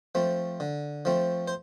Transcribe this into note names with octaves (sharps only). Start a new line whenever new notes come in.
F3 A3 C4
D3
F3 A3 C4
C5